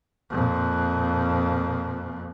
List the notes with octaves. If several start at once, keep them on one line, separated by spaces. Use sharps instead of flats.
F2 A#2